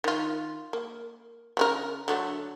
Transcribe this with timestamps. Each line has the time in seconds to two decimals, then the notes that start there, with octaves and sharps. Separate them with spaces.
0.04 D#3 F4
0.73 A#3
1.57 C#3 C4 A#4
2.08 D3 F#3 A3